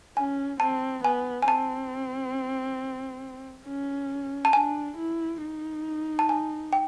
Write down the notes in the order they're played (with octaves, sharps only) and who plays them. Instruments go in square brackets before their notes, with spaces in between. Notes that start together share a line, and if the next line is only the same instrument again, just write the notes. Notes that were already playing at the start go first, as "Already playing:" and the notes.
[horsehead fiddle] C#4 [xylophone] G#5
[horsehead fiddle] C4 [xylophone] A5
[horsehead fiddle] B3 [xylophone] G#5
[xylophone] G#5
[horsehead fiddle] C4 [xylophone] A5
[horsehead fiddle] C#4
[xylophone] A5
[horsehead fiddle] D4 [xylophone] G#5
[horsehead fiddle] E4
D#4
[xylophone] A5
G#5
G5